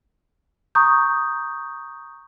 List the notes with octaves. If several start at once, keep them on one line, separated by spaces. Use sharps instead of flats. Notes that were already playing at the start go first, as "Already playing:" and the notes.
A#5 C#6 D#6 G6